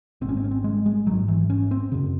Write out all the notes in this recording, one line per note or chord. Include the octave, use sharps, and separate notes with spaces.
G#1 G#2 C4
C#4
C4
C#4
C4
G#3
G#3
G#1 G#2 F#3
E3
C#4
C4
F#2 C#3